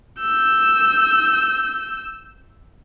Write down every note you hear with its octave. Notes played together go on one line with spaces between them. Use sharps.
E6 G6